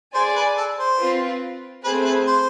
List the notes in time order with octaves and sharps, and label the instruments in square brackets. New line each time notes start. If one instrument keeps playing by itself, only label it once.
[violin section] G#4 D5 G#5 [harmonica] C5
[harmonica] B4
A4
C5
[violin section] C4 F4 B4
[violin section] A3 C4 G#4 C5 [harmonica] B4
[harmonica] B4
C5